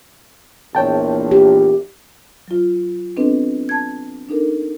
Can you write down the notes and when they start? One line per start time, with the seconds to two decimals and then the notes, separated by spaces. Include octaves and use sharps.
0.75 A#1 E2 C#5 G5 A5
1.31 G4
2.48 F#3 F4
3.16 B3 C4 D4 A4 B4 D#5
3.69 A5 G#6
4.29 D4 D#4 A4 A#4